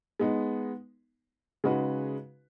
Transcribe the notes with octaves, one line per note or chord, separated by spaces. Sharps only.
G#3 B3 D#4
C#3 G#3 D#4 F#4 B4